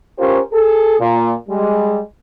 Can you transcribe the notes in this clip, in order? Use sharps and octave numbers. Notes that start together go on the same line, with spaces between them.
C#4 F4 G4 A#4 C5
G#4 A4
A#2
G3 G#3